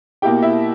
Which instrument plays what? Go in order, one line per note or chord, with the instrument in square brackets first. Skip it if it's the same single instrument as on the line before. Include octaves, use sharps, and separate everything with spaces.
[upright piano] B2 A#3 E4 G4 G5
E4 E5